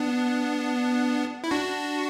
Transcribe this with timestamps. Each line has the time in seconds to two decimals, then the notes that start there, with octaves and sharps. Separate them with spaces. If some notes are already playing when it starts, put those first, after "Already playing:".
Already playing: B3 D4
1.44 E4
1.51 D4 F#4